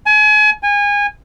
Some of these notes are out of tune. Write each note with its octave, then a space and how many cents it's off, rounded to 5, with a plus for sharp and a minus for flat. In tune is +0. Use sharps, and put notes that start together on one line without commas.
G#5 +35
G#5 -25